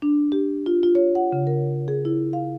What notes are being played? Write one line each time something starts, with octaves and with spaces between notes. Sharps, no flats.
D4
G4
F4
F4
C#5
F#5
C#3
A#4
G#4
E4
F5